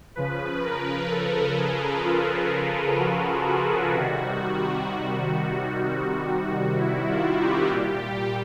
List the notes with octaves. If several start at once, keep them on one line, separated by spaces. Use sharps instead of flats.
C#3 F3 B4
A#4
A4
G#4
F4
F#4
F#4
C3 D#3 G3 F#4
E4
F4
G4
A#2 G3